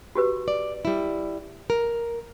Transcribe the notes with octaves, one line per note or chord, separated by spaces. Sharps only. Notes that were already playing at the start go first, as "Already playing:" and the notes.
F#4 G4 B4
D5
G3 E4
A#4